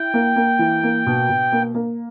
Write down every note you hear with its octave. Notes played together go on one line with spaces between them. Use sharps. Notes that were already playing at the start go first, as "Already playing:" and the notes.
Already playing: E4 G5
A#3
A#3
E3
A#3
B2
B2
A#3
A#3